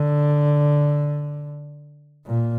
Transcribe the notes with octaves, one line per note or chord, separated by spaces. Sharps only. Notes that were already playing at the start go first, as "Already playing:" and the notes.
Already playing: D3
A#2